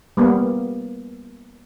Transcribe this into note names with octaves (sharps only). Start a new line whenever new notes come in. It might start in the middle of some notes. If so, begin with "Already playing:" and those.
G3 A#3 B3